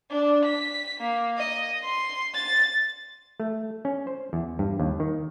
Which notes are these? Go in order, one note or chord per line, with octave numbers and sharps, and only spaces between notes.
D4
B6
A#3
D#5
C6
A6
A3
C#4
C5
E2
G2
D#2
D#3